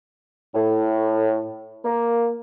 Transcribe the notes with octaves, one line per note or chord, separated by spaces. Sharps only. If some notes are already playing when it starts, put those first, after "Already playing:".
A2
A#3